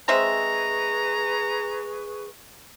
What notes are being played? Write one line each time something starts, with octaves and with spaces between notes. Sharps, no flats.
G#3 C4 G#4 B4 E5 A#5 C#6